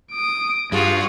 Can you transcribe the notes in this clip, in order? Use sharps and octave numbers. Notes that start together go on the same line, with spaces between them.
D#6 D7
G2 F4 F#4 G#4